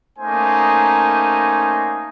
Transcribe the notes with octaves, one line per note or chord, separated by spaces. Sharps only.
A3 A#3 C#4 D#4 C5 G#5